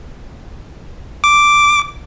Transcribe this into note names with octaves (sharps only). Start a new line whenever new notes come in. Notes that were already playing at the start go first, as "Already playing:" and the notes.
D6